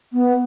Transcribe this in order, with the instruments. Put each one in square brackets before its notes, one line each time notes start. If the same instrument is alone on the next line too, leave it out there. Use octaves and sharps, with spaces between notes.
[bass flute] B3